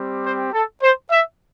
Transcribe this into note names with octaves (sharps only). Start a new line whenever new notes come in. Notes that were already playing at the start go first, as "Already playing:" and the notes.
Already playing: G3 C4 G4
C5
A4
C5
E5